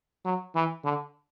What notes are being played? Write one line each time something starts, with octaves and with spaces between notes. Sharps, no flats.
F#3
E3
D3